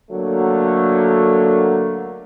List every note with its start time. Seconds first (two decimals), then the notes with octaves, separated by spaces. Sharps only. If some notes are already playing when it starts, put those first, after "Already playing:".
0.11 D3 F#3 A3 A#3